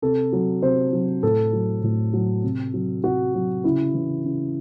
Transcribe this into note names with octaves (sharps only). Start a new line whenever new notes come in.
C3 A4
F#3
C3 C5
F#3
A2 A4
F#3
A2
F#3
C3
F#3
C3 F#4
F#3
C#3 E4
E3
C#3